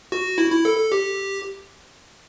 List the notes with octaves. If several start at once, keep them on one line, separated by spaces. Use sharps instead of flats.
F#4
E4
E4
A4
A4
G4